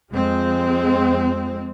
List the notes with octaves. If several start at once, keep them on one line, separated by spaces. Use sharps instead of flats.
F2 G#3 C4